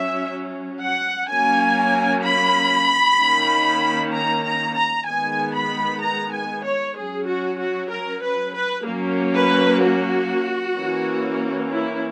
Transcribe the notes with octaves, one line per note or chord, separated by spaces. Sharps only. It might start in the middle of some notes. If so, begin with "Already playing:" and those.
Already playing: F#3 C#4 E5
F#5
F#3 A#3 C#4 G#5
B5
D#3 A#3 C#4
A#5
A#5
A#5
D#3 G#3 B3 G#5
B5
A#5
G#5
C#5
F#3 C#4 G#4
F#4
F#4
A#4
B4
B4
F#3 A#3 C#4
B4
F#4
E3 A#3 C#4
E4